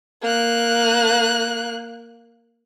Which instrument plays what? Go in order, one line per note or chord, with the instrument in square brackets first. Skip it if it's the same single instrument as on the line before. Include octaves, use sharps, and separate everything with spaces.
[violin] A#3 F#6